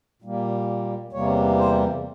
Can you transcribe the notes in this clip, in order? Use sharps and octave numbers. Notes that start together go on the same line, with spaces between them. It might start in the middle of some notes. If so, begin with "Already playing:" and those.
A#2 G3 A#3
E2 C3 G3 A#3 C#5
C5